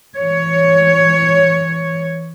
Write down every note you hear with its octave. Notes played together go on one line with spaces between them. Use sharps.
E3 C#5